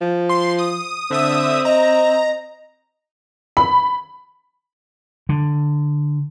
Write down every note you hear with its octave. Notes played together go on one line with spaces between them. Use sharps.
F3
C6
D#6
D3 C4 E5 D#6
D#5 A#5
B5
D3